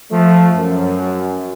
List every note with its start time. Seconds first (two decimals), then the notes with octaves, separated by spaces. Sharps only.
0.12 F3 A3
0.55 F#2